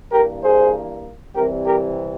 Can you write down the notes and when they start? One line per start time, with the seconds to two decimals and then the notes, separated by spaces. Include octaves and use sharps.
0.12 G2 E3 A#3 G4 A#4
0.42 G#4 C5
1.34 C2 C3 E3 G3 G4 A#4
1.65 G4 A#4